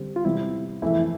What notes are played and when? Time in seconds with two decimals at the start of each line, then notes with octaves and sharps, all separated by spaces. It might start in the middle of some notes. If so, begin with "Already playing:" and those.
Already playing: D3 G3 C4 G4
0.16 F4
0.25 C3 G3 B3 E4
0.82 F2 E3 A3 E4